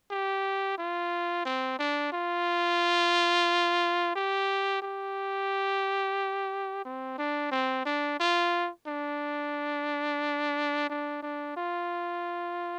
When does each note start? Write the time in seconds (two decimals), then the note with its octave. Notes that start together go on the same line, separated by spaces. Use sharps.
0.10 G4
0.77 F4
1.45 C4
1.79 D4
2.12 F4
4.15 G4
4.82 G4
6.85 C4
7.18 D4
7.51 C4
7.85 D4
8.19 F4
8.86 D4
10.89 D4
11.22 D4
11.56 F4